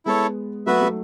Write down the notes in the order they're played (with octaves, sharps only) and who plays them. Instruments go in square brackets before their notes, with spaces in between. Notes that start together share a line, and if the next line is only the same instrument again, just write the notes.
[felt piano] G#3 B3 [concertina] E4 A4 C#5
[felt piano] F#3 A3 [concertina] B3 F#4 B4 E5
[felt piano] F#3 A3